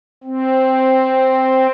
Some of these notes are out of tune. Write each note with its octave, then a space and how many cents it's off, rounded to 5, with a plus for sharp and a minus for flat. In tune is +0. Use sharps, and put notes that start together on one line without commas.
C4 +0